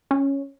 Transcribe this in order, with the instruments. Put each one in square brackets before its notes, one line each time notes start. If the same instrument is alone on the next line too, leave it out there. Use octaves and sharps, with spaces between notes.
[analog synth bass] C#4